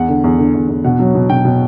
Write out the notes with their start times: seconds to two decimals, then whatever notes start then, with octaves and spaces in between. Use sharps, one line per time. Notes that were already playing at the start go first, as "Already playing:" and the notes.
Already playing: E2 F#5
0.08 D3
0.24 E2
0.39 D3
0.54 E2
0.69 E2
0.84 B2 F#5
0.99 F#3
1.15 B2
1.30 B2 G5
1.45 B2